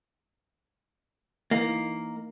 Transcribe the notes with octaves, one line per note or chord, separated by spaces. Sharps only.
E3 A#3 D#4